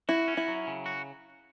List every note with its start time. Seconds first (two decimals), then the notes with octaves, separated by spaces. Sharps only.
0.09 E4 F#4
0.28 C#4
0.37 E4
0.48 F#3
0.67 C#3
0.86 F#4